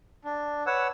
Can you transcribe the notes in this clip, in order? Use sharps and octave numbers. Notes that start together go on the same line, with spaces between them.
D4
B4 C#5 F#5 E6